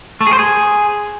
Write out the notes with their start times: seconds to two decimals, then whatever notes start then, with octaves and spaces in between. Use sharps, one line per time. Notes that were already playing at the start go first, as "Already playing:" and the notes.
0.21 A3
0.27 G#4
0.33 C5
0.39 G#4